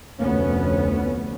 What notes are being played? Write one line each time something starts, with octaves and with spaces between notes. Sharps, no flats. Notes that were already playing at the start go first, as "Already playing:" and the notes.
F1 D2 B3 C#4